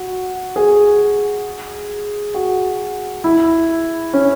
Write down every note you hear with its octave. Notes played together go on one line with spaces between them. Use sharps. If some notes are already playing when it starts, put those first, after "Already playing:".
Already playing: F#4
G#4
F#4
E4
C#4